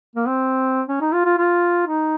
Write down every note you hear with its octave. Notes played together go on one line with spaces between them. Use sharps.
A#3
C4
C#4
D#4
F4
F4
F4
D#4